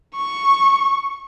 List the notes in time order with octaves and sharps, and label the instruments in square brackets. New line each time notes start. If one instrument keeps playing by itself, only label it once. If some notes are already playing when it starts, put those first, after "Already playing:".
[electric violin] C#6